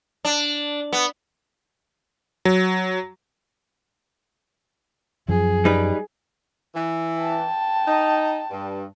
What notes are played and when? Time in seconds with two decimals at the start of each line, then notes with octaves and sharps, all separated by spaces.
0.25 D4
0.93 B3
2.45 F#3
5.29 F#2 F3 G#4
5.65 G3 D#4 B4
6.75 E3
7.20 G5 A5
7.86 D#4
8.51 G2